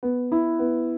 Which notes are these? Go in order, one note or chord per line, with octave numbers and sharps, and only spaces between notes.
B3
E4
B3